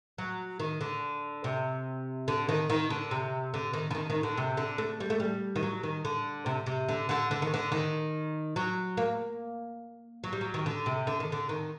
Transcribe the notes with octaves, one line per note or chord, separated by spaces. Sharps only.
F#3
D#3
D3
C3
D3
D#3
D#3
D3
C3
D3
D#3
D3
D#3
D#3
D3
C3
D3
A3
G3
A3
G3
D#3
F#3
D#3
D3
C3
C3
D3
D3
D3
D#3
D3
D#3
F#3
A#3
F#3
G3
F#3
D#3
D3
C3
D3
D#3
D3
D#3